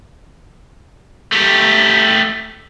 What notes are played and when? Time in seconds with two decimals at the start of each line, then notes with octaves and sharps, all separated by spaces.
1.32 A3 G4